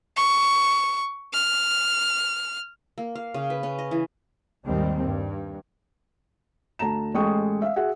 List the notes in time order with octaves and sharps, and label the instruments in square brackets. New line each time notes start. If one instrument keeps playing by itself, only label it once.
[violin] C#6
F6
[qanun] A#3
F5
C#3
B4
C#4
D#5
E3
[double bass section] D#2 G#2 D#3 G3 C4
G2
[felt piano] D2 A5 A#5 E7
A1 G#3 A4 G5 C#6 D#6
E5 F5
F#4 G#4 E5 F#5